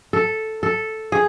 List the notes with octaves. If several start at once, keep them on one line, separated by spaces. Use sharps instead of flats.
A4
A4
G#4